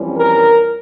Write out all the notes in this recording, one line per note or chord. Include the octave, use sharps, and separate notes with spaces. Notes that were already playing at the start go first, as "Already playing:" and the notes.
Already playing: F2 E3 G3 C#4
A#4